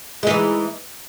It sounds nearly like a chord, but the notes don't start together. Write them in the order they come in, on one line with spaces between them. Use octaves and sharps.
G#3 D#4 E3